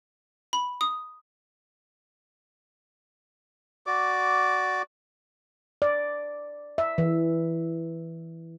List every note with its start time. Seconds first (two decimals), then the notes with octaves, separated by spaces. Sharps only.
0.53 B5
0.81 D#6
3.87 F#4 D5 D6
5.82 D5
6.78 E5
6.98 E3